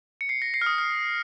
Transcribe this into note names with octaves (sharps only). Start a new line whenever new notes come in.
C#7
C7
A#6
C7
F6
D#6
F6